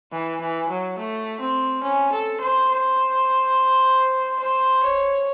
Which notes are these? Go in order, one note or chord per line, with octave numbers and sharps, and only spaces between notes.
E3
E3
F#3
A3
C4
C#4
A4
C5
C5
C5
C#5